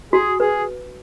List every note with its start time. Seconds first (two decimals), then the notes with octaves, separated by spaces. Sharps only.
0.12 F#4 G#4
0.40 G#4 B4